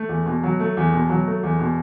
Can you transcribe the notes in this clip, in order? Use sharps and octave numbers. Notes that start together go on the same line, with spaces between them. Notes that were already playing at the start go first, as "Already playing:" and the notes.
Already playing: A3
E2
B2
F#3
A3
E2
B2
F#3
A3
E2
B2